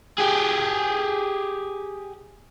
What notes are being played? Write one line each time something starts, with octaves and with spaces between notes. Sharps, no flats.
G4 G#4